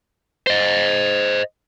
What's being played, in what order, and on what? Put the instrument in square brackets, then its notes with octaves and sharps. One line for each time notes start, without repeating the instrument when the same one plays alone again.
[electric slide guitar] C5 D#5